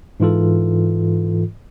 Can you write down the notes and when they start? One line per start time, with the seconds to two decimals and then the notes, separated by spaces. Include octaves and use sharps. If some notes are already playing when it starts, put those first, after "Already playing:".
0.20 G#2 E3 F4 A4